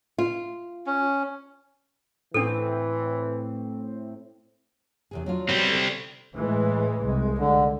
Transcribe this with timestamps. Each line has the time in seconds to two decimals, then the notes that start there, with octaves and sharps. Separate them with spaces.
0.18 F4
0.86 C#4
2.34 A2 E3 C4 D4 A4
5.11 E2 C3 G#4
5.26 F#3 D4 F4
5.49 G3 B3 C4 F#4
5.68 D3
6.33 A2 E3 G#3
7.02 C2 G#3
7.38 D3